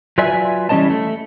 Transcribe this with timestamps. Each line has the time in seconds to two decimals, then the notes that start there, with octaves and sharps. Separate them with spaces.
0.18 F#3 F4 B4 D5 E5 G#5
0.69 E3 G3 C#4 C5 D#5 A5
0.90 A3